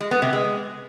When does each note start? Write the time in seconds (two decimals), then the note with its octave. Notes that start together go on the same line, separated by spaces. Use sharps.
0.01 G#3
0.11 B3
0.22 C3
0.33 G#3